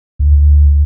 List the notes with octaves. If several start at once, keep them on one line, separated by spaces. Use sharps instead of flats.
D2